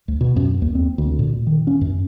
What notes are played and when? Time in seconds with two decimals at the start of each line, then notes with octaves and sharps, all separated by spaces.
0.08 D2
0.21 B2
0.36 F#2
0.62 D#2
0.75 C4
0.98 D2
1.19 A#2
1.47 D#3
1.67 C#4
1.81 F#2